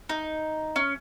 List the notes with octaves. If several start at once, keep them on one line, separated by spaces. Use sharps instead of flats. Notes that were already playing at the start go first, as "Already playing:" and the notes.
D#4
C#4